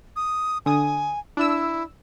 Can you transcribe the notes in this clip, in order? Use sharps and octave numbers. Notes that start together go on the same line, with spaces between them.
D#6
D3 G#5 D#6
D4 E4 E6